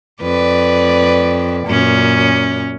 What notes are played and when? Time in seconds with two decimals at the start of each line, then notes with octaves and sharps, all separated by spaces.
0.22 F2 B4 D5
1.67 F#2 A#2 C#4